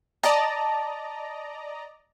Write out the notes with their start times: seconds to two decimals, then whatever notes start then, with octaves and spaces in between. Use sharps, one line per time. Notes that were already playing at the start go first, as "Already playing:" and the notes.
0.23 D5 D#5 A5 A#5